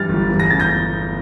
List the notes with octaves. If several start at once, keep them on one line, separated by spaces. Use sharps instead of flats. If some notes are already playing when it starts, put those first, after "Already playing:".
Already playing: G2 E3 G3 F6 A6
G1
E2
A#6
C#3 A6
G6 A#6